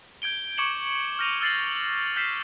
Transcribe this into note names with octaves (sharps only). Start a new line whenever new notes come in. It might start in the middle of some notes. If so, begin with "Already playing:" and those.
G6 G#6 D7 G7
C#6 D6 G#6 C#7 E7 F#7
F6 G6 A#6 D#7 F7
E6 F6 A6 C7 F#7
F6 G6 B6 C7 E7